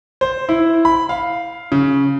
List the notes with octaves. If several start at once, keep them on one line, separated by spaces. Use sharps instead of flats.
C5
E4
B5
F5
C#3